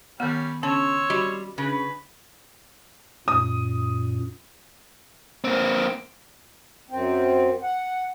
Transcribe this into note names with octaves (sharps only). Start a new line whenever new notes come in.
D#3 G3 B3 C#4
C#3 C#4 C#5 C6 E6
G3 F#4 D#5 B5
C#3 B4
F#2 A#2 D#6
A#3 C4
F#2 C4
F#5